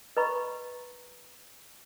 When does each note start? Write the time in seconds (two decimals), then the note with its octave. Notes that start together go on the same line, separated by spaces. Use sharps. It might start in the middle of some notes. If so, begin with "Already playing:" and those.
0.17 B4 D#5 A#5 B5 C#6